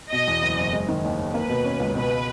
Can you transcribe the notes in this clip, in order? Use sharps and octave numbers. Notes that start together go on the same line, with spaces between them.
B2 D#5
E2
F#1
F#1
G#3
D#3
D#2
D#2
A#3 B4
B2
C#4
C#2
B2 B4